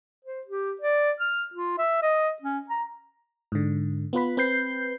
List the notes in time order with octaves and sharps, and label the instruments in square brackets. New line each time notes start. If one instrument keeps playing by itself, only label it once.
[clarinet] C5
G4
D5
F6
F4
E5
D#5
C#4
A#5
[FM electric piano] G#2 D3
B3 F4 B4 B5
C4 B4 G6 C7